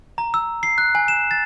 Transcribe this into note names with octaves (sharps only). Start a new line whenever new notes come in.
A#5
E6
C7
F#6
G#5
E7
A6